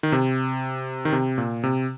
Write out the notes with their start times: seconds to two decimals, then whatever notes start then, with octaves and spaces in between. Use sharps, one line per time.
0.03 D#3
0.12 C3
1.05 D#3
1.12 C3
1.38 A#2
1.63 C3